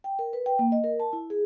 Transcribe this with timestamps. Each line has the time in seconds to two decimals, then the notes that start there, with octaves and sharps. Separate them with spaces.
0.04 G5
0.19 A#4
0.33 B4
0.46 G5
0.59 A#3
0.72 D#5
0.84 A#4
1.00 A5
1.13 E4
1.30 G#4